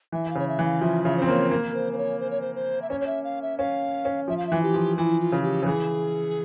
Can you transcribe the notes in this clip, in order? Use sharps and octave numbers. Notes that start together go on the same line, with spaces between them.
E3 E5
F5
C#3 C#5
E5
E3
F5
F3 E5
C#3 E5
C5
C4
A#3 C#5
A#3 A#4
C5
C5
C#5
C5
C#5
C5
C5
E5
C#4 C#5
C#5
E5
F5
E5
C#4 F5
C#4
F3 E5
F5
E3 E5
G4
F3
E3 E4
F4
C#3
G4
C#3
E3 G#4